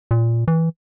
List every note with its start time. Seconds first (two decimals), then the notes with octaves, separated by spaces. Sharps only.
0.11 A#2
0.48 E3